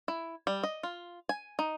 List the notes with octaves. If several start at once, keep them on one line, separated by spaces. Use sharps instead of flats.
E4
G3
D#5
F4
G#5
D#4